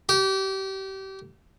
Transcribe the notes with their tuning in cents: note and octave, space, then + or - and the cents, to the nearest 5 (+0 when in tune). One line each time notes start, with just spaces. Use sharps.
G4 -30